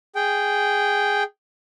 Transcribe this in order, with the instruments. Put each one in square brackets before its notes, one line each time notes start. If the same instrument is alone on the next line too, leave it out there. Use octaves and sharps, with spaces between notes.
[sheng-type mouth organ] G#4 G5